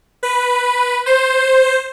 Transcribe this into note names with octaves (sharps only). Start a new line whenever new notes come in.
B4
C5